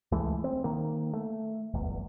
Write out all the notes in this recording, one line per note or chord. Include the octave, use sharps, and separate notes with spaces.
C#2 E3 G#3 A3
C4
D#3 A#3
A3
D1 G1 E2